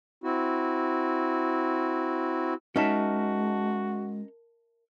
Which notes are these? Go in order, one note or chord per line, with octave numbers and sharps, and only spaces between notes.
C4 E4 F#4
G#3 C#4 D#4 F#4 A#4 E5 A5